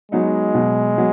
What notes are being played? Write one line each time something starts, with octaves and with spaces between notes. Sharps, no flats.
F#3 G#3 B3 D#4
B2 F#3 B3
F#3 B3